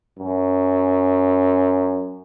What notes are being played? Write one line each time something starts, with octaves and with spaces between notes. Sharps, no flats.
F#2